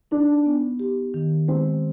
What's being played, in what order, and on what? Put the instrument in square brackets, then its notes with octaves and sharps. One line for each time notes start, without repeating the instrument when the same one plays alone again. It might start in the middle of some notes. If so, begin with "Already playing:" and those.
[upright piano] D4 [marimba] D#4
[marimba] B3
G4
D#3
[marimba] G#3 [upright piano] C4